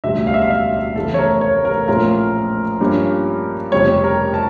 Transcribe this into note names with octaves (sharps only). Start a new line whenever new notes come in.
E1 D2 C#3 G3 E5
F5
E5
F5
E5
E5
F1 E2 C#3 E3 A3 A4
C#5
A#4
C#5
A#4
A#1 A2 F3 C#4 F4 A#4
G2 F3 A#3 C#4
F1 F2 C#3 G3 C#5
A#4
A5